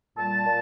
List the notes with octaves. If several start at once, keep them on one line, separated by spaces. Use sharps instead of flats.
A#2 G3 A5
A#2